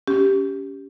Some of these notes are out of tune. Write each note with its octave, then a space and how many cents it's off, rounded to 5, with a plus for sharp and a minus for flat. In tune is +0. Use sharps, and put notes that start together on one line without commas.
C#4 +20 G4 +0